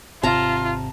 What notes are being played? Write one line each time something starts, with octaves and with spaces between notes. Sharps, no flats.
G#1 C3 F4 A5 A#5